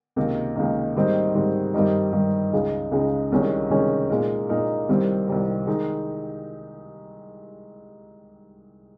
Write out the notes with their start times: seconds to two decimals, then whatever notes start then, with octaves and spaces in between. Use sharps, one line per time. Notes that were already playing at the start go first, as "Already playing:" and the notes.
0.16 C#2 C3 D#3 A#3
0.56 C#2 C3 D#3 A#3
0.96 G#2 D#3 G3 C4 D#4
1.34 G#2 D#3 G3 C4 D#4
1.74 G2 D#3 G3 C4 D#4
2.13 G2 D#3 G3 C4 D#4
2.52 C#2 C#3 G#3 D#4
2.91 C#2 C#3 G#3 D#4
3.32 C2 C3 D#3 G#3 C#4
3.70 C2 C3 D#3 G#3 C#4
4.09 A#2 G#3 D#4 A#4
4.49 A#2 G#3 D#4 A#4
4.88 C2 C3 D#3 G3 C4
5.27 C2 C3 D#3 G3 C4
5.67 D#3 G#3 D#4